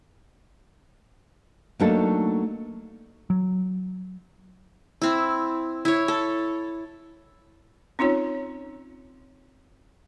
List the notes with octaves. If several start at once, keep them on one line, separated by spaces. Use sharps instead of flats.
F#3 A3 A#3 D4 D#4 A4
F#3
C4 E4
E4 C#5
A4
C4 C#4 D#4 F4 C#5